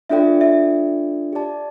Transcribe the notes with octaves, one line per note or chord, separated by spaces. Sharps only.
D4 F4 A4 D5 E5 G5
E5
G4 D5 A5